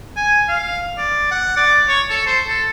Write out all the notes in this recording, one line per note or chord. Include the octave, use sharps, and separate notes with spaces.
G#5
F5
D5
F#5
D5
C#5
A4
C5
A4